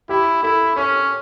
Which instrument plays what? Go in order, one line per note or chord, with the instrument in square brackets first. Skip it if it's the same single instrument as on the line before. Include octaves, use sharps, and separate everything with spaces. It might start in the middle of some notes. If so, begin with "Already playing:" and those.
[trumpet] E4 [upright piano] G4
[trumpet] E4 [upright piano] A4
[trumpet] C#4 [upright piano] C#5